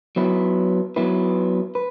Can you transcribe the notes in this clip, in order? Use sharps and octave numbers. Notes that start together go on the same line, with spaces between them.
F#3 B3 E4 B4
F#3 B3 E4 B4
B4